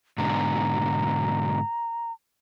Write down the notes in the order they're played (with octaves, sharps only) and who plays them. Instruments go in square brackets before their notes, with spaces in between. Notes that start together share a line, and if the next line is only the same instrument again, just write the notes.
[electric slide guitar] G#2 B2 D3 [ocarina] A#5